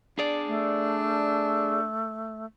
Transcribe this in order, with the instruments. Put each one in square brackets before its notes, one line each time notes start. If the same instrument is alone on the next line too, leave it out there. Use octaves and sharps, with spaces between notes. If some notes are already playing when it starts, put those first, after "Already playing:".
[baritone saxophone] D4 [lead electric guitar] G#4 D5
[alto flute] A3